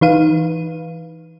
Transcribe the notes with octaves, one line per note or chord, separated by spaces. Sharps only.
E3 D#4 B4 F5 D#7